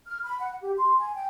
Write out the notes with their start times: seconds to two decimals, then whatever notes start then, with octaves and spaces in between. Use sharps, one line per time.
0.06 F6
0.22 B5
0.39 F#5
0.61 G4
0.77 C6
0.98 G#5
1.14 G5